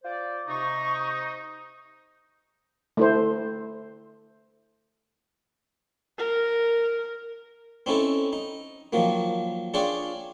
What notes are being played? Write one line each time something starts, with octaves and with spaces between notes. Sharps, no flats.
F4 C5 D5
C3 D#4 C#6
A3 E4 C5
A#4
C4 C#4 D#4 E4 A4
D#4
D#3 F3 F#3 A#3
D4 F4 G#4 C#5 D5 G5